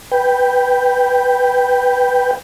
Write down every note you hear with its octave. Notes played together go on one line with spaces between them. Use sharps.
B4 G5